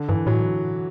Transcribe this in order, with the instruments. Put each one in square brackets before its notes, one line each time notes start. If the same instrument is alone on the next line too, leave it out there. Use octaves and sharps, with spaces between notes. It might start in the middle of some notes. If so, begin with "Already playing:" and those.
Already playing: [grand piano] D3
[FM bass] G2 [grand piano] E3
[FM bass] A2 [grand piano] F#3